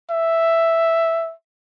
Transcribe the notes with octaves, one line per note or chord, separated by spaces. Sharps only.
E5